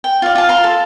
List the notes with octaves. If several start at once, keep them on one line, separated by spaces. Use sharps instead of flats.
G5
F4 D5
F4 A5
F5 A#5 C6
A4